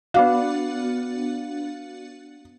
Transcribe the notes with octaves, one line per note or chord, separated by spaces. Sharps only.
B3 D4 F#4 F5